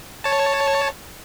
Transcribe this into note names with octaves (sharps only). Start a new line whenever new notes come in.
C#5 A5